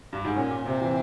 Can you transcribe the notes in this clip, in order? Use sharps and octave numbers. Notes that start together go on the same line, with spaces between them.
G2
G#2
A#2 C#4
A#2
C3 C4
E3